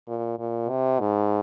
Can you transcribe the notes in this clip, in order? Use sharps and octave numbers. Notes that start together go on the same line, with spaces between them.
A#2
A#2
C3
G#2